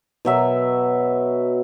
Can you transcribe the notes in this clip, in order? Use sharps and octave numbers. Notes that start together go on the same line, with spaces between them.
B2 F#3 E5